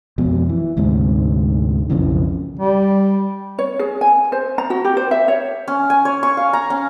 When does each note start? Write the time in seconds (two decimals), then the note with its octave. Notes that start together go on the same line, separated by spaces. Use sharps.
0.18 F2 B2
0.49 E3
0.77 D2 G#2 C3
1.90 B1 F2 C#3 E3
2.59 G3
3.59 C#5
3.79 G#4
4.01 G#5
4.32 C5
4.58 A#5
4.70 F#4
4.85 G4
4.97 C5
5.11 E5
5.28 C#5
5.67 C#4
5.90 G#5
6.05 C#5
6.23 C#6
6.37 F5
6.53 A#5
6.70 C#4